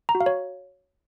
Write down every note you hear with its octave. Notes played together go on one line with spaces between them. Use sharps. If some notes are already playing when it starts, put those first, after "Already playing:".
A#5
F#4
F5
C#5